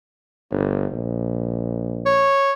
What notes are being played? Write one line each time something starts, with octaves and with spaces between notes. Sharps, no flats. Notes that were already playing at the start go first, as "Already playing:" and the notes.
G1
A#1
C#5